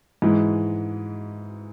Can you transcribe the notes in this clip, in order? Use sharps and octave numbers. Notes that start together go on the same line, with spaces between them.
G#2 E3 G#3